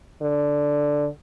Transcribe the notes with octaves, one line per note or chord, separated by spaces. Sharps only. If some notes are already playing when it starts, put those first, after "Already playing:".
D3